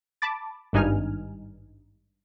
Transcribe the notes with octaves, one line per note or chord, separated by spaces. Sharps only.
A5 B5 D6 A6
G#1 G2 D#4 G#5 F6